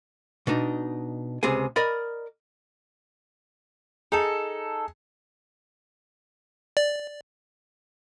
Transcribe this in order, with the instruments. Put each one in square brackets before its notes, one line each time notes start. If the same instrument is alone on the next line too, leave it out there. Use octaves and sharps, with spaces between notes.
[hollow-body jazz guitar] B2 D4 D#4
C#2 C3 G#4 G#5
A#4 D5 D#5 B5
[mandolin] D#4 A4 [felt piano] G#4
[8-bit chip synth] D5